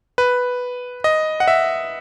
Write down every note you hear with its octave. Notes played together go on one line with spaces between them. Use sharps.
B4
D#5
F#5
E5